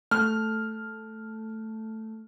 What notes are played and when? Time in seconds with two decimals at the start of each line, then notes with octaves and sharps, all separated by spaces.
0.11 A3 F6